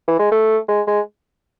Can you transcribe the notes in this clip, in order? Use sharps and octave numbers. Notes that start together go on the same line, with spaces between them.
E3
G#3
A3
G#3
G#3